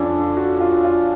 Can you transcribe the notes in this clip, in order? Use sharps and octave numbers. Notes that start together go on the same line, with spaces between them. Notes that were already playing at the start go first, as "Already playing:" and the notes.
Already playing: F2 F3 C#4 D4
F#4
F4
F4